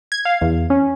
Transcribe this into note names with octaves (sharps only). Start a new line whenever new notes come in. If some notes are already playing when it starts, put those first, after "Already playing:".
G#6
F5
E2
C#4